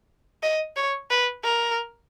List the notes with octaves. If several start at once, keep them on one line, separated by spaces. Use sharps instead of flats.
D#5
C#5
B4
A#4